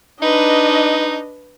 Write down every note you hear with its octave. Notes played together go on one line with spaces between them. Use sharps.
D4 D#4 B4 D#5